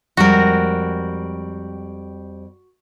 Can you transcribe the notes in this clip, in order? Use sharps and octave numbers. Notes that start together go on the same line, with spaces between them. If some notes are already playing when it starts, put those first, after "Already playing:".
F2 G3 G#3 F#4 A#4